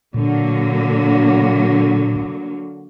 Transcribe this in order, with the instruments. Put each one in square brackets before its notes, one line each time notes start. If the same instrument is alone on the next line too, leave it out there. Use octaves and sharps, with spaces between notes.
[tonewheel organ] A#2 [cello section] D3 F#3 A#3